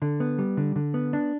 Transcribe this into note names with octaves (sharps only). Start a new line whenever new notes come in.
D3
B3
G3
D3
D3
B3
D4